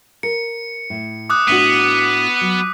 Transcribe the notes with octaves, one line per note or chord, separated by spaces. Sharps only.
A#4 C#7
A2
D6 D#6 F#6
A2 B3 D4 F#4 B6
F#3